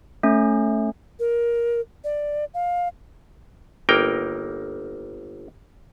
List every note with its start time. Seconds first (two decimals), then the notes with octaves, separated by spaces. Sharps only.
0.23 A3 C#4
1.20 A#4
2.04 D5
2.54 F5
3.89 G1 A#3 D#4 A#4 G5